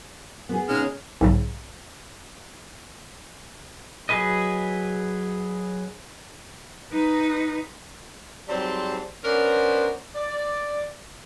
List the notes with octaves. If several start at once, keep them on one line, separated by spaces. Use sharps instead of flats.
B3 G#4
C#3 G#3 C#4 D#4 F6
B1 G#2 C#3
F#3 G#4 B4 D#5
D#4 B4
G#2 F#3 G3 C4 C5 A5
B3 C#4 D4 A#4 C5
D5